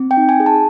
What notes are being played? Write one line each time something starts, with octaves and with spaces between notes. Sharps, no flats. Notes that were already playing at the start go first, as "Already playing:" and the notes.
Already playing: C4
G5
D#4
G#5
G#4
A5